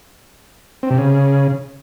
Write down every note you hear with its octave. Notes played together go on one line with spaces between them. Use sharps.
C4
C3
C#3